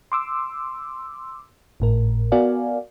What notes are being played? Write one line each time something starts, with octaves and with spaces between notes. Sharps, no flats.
C6 D6 E6
G#1 A2 A#4
B3 F#4 A#4 D5 F5 G#5